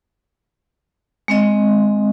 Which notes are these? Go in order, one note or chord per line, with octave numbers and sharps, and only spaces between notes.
G#3 C4 D#5